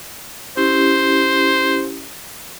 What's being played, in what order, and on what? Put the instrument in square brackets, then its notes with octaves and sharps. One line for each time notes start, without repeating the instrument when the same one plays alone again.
[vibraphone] C#4 E4 G4 [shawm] C5